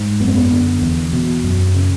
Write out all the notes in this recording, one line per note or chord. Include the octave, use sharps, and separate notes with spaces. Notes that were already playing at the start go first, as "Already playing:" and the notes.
Already playing: G#2
F#2 B3
C4
B3
D3
E2
B2
F#2
C#3